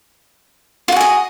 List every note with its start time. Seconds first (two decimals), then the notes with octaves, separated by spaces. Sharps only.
0.88 F4
0.92 F#4
0.96 G#4
1.01 D#5